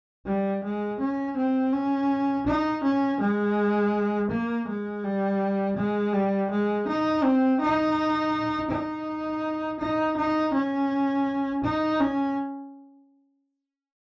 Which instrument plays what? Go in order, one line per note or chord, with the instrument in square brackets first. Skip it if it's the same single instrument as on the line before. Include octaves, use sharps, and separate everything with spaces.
[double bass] G3
G#3
C#4
C4
C#4
D#4
C#4
G#3
A#3
G#3
G3
G#3
G3
G#3
D#4
C4
D#4
D#4
D#4
D#4
C#4
D#4
C#4